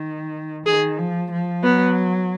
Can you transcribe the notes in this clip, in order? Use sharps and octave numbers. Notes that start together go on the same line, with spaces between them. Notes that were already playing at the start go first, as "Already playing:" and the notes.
Already playing: D#3
D#3 G#4
F3
F3
F#3 B3